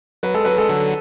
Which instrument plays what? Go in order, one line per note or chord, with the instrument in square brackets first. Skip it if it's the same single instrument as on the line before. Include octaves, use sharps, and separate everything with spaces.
[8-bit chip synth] F#3 [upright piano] B4
[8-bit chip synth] G#3 [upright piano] A4
[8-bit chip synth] F#3 [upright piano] B4
[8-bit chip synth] G#3 [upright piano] A4
[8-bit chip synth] D3 F#3